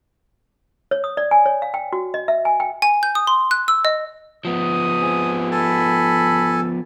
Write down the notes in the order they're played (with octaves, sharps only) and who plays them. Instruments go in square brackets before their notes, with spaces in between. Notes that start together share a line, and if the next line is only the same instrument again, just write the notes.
[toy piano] C#5
D#6
D5
G#5
C#5
F5
G5
F#4
D#5
E5
G#5
G5
[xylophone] G#5
G6
D#6
C6
F#6
E6
D#5
[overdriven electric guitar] F3 B3 [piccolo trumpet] D#6
[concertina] C4 G#4
[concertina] A4 G#5 A5 [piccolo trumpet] B5